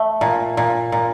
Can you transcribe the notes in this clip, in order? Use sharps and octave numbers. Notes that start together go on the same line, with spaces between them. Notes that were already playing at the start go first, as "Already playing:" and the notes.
Already playing: A3
A#2
A#2
A#2